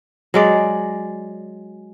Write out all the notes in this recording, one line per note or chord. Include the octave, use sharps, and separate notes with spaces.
F#3 G#3 D5